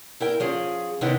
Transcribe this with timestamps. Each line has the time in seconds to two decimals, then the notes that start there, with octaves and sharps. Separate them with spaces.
0.20 E4 A#4 G5
0.40 F3 C#4 G#4
1.01 C3 D#3 B3 C#4 D#4 E4